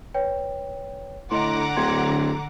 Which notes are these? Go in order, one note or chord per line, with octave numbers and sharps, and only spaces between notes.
B4 C#5 G5
A2 D3 D#5 F#5 A#5 C6 D6
D1 G5 C6 G#6